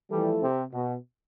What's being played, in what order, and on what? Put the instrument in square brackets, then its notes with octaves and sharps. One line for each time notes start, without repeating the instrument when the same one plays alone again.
[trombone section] E3 G3 [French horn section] F3 A3 E4 A4
[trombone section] C3
B2